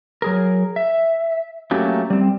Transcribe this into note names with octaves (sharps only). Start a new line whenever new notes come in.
F#3 G#4 A#4
E5
F#3 A3 A#3 C#4 G4
G3 C4